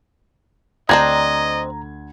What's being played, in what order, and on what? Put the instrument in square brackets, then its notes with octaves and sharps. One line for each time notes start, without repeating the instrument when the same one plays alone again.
[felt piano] D2 G#6 [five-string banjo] C4 D4 C5 [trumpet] D#5 [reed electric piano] A#5